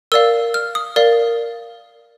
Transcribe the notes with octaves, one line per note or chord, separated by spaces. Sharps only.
A#4 D5 F5 E6
F6
D#6
A#4 D5 F5